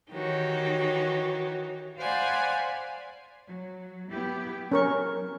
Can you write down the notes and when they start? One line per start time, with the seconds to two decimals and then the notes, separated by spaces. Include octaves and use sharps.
0.11 D#3 E3 F#4 G4 C#5
1.98 C5 D5 F5 F#5 G#5 B5
3.48 F#3
4.11 B3 E4 G4
4.72 F#3 C#4 A#4 C#6